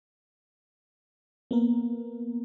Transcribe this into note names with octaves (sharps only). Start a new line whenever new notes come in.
A#3 B3 A#4